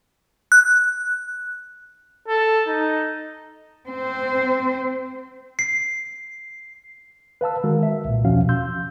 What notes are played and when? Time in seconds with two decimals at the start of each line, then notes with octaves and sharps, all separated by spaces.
0.52 F#6
2.28 A4
2.68 D#4
3.89 C4 C5
5.59 C7
7.41 B4 F5 A5 E6
7.64 D#3 G#3 F#4 A#4
7.83 E5
8.05 C2 A#2
8.25 E2 B2 F3 C#4 F#4 F5
8.49 C6 E6 G6